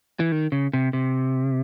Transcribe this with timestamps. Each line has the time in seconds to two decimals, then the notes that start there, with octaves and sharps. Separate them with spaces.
0.20 E3
0.32 D#3
0.52 C#3
0.73 C3
0.93 C3